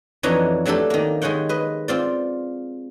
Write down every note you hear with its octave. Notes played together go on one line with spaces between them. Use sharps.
F2 E3 D4 D#4 C#5 A#5
F#3 A3 D4 G4 A4
D#3 A#3
D#3 G#3 C#5 F#5 G5
B4 D#5
C4 F4 D5